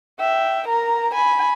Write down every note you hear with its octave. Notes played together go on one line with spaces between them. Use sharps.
E5 G5
A#4 A#5
G#5 B5